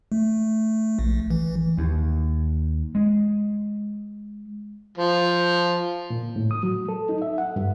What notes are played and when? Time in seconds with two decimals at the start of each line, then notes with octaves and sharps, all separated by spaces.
0.12 A3
0.99 A#1
1.30 E3
1.77 D#2
2.95 G#3
4.98 F3
6.10 A#2
6.36 A2
6.51 D#6
6.63 F#3
6.89 A4
7.09 D#4
7.22 E5
7.38 F#5
7.56 G2